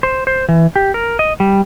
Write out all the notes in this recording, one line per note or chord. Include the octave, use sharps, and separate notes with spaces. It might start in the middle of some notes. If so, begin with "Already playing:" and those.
C5
C5
E3
G4
A#4
D#5
G3